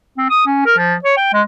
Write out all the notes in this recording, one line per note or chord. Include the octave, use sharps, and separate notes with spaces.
C4
D#6
C#4
A#4
F3
C#5
G5
G#3